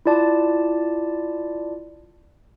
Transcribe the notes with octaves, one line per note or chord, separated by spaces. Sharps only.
E4 F4 D5 A5